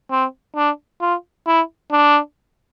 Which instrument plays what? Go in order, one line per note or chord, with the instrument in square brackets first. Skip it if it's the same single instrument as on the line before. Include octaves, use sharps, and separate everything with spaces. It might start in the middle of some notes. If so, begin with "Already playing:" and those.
[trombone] C4
D4
F4
E4
D4